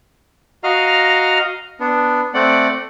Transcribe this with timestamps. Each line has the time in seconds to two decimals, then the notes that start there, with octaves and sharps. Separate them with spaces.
0.64 F#4 D#5 F5 A#5 F6
1.80 B3 D4
2.34 A3 C4 D5 F#5